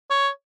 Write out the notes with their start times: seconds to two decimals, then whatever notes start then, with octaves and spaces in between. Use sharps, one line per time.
0.10 C#5